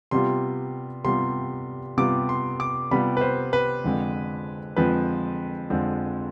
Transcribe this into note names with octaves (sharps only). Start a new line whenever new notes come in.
C3 G3 B3 F4 C6
C3 G3 B3 F4 C6
C3 G3 B3 F4 D6
C6
D6
C3 G3 B3 F4 B5
B4
C5
B4
F2 D3 F3 G#3 C4
F2 D3 F3 G#3 C4 B4
F2 D3 F3 G#3 C4